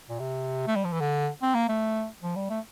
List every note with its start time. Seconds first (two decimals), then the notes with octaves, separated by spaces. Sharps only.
0.09 A#2
0.20 C3
0.67 A3
0.76 G3
0.84 F3
0.93 E3
1.00 D3
1.42 C4
1.55 A#3
1.69 A3
2.23 F3
2.36 G3
2.50 A3